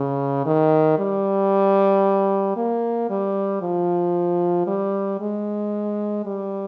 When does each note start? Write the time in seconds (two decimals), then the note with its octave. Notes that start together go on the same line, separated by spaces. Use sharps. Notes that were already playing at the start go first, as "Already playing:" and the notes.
Already playing: C#3
0.46 D#3
0.99 G3
2.56 A#3
3.10 G3
3.62 F3
4.67 G3
5.21 G#3
6.26 G3